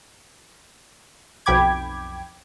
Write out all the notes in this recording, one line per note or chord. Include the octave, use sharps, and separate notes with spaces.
B1 F2 G5 B5 D6 G#6